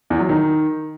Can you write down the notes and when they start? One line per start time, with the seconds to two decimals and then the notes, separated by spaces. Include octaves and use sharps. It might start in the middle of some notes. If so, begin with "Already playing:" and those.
0.10 E2
0.20 F#3
0.29 D#3